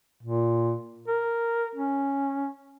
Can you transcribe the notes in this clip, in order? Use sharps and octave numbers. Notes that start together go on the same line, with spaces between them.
A#2
A#4
C#4